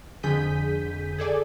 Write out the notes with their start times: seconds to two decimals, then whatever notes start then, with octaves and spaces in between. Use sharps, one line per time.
0.23 F2 D3 G#4 G6 B6 D#7
1.18 G#4 A4 D5 G#5